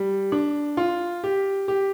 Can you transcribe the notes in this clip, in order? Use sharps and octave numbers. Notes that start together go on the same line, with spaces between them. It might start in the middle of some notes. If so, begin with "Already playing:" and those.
Already playing: G3
D4
F4
G4
G4